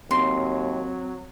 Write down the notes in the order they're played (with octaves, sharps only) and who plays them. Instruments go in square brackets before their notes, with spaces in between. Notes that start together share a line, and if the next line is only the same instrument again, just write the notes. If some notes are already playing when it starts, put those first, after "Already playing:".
[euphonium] D#2 [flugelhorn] F#3 [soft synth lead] C4 [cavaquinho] C6